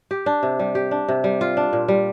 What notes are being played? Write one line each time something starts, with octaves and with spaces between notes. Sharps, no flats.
G4
D4
C3
G3
G4
D4
C3
G3
F4
D4
A#2
G3